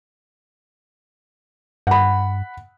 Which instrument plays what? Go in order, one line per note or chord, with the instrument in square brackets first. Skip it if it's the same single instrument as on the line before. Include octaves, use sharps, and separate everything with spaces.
[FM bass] G2 [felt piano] F#5 B5